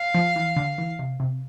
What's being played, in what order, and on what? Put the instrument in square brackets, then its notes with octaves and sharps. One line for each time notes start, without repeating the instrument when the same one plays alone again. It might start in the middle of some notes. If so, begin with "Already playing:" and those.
Already playing: [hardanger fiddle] F5
[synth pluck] F3
E3
D3
E3
C3
C3